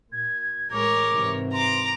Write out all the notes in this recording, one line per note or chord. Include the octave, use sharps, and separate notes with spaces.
A#2 G#6
A1 G#3 A#4 C#5 D6
G#2 C3 E3
A#5 C6 D6